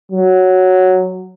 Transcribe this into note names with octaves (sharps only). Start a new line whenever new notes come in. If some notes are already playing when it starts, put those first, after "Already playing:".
F#3